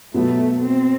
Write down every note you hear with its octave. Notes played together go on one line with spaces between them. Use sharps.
B2 F#3 A3 B3
C4